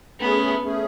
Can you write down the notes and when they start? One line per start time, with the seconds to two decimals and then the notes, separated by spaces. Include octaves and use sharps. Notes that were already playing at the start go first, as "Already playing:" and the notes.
0.20 A3 B3 C#4 G#4
0.63 A3 C#4 G#4